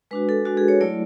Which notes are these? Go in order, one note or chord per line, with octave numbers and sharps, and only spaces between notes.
G#3 D4 F#4 B4
A4
G#3 D4 F#4
G#4
C#5
F#3 A3 E4 D5